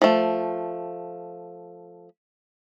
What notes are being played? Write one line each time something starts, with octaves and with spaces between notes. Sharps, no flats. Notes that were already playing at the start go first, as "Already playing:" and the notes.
F3 A3